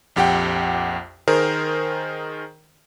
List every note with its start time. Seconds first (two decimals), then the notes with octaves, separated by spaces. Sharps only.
0.16 A#1 F2 G4 F#5 G5
1.28 D#3 G#4 A#4 C5